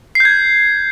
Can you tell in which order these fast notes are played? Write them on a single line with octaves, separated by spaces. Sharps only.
C7 G6 G#6